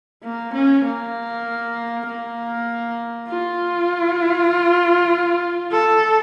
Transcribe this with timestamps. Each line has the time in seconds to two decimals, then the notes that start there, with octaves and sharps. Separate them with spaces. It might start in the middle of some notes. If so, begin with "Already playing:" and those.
0.23 A#3
0.54 C#4
0.85 A#3
2.07 A#3
3.28 F4
5.72 A4